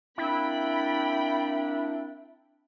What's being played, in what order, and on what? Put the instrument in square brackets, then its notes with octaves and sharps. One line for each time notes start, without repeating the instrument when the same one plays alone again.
[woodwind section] A#3 C4 D4 [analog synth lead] E4 [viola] G5 [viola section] B5